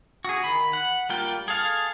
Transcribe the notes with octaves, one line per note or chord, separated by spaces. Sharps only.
F#4 G#4
D#3 B5
F#5
G3 A#3 F4 G5
G#4 A4 F5